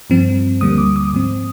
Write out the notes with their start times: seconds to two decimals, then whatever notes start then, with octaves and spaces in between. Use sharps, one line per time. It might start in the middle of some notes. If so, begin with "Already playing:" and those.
0.10 G2 F3 C4
0.61 D2 D3 G3 A#3 D#6
0.78 D6
0.96 D#6
1.13 G#2 F3 C4